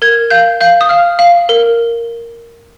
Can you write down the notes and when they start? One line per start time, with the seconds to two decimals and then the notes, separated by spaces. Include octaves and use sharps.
0.02 A#4 G#6
0.30 F5 G6
0.61 F5 G6
0.81 D#6
0.89 F5 F6
1.19 F5
1.49 A#4